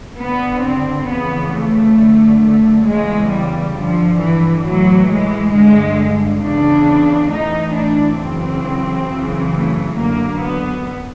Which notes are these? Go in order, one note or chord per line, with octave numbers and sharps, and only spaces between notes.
G2 D3 B3
C4
F2 C#3 E3 B3
A3
F#2 D3
A3
E2 C#3 E3 G#3
G3
G2 D3 F3
E3
A2 E3 F#3
G#3
G2 D3 G#3
E2 C#3 E3 D4
A2 E3 D#4
D4
F#2 C#3 E3 C4
F#2 C#3 E3
A3
F#2 D3 A#3
B3